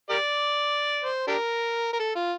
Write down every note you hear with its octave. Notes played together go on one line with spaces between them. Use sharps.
G4 A#4 D5
C5
D4 G4 A#4
A#4
A4
F4